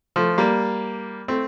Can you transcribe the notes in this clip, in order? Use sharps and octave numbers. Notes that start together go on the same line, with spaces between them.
F3 A3
G3 A#3
A3 C4